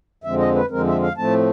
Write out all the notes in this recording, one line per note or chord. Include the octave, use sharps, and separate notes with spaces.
F2 D3 F3 G#3 C4 E5
D#5
B4
F2 D3 F3 G#3 C4 A#4
E5
F5
A2 F3 A3 C4 A5